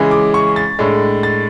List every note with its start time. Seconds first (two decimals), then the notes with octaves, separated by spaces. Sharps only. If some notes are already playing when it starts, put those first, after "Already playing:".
Already playing: C#3 E3 G#3
0.11 D6
0.34 C#6
0.56 A6
0.79 A2 G#3 D4
1.23 A6